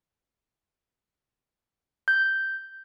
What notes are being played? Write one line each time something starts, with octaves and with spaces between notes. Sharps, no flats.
G6